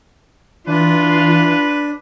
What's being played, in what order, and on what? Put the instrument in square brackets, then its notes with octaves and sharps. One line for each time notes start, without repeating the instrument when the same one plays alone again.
[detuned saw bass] E3 [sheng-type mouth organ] D4 [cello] F4 [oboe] B4